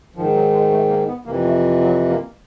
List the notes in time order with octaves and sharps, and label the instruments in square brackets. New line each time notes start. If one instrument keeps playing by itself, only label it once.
[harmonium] G#2 D#3 F3
F#3
G#3
A3
A#3
B3
F2 C3 E3 A#3
A3
F#3
A#3